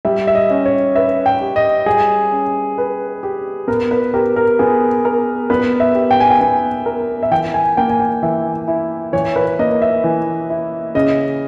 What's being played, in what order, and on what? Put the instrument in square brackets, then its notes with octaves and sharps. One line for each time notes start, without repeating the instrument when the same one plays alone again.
[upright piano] G3 [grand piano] E5
[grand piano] E5
D#5
[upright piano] C#4
[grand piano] C#5
[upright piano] B4 [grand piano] E5
[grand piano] G5
[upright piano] G4
[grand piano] D#5
[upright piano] G3 [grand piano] G#4
[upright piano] C#4
B4
G4
[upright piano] B3 [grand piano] A#4
[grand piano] B4
[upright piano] G4 [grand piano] A#4
[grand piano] A#4
[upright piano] B3 [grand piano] G#4
[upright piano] A#4
[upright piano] B3 [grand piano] B4
[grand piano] E5
[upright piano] G4
[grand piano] G5
G#5
G5
[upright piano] B3 [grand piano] G#5
[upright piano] A#4
[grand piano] E5
[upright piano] E3 [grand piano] G5
[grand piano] G#5
[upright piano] A#3 [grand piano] G5
[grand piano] G#5
G5
[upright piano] E3 [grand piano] E5
[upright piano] E4
[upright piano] E3 [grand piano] C#5
[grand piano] B4
[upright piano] A#3 [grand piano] D#5
[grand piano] E5
[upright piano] E3
E4
[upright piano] C#3 [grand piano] D#5